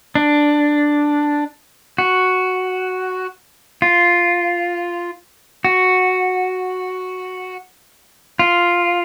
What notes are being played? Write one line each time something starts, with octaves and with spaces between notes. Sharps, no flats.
D4
F#4
F4
F#4
F4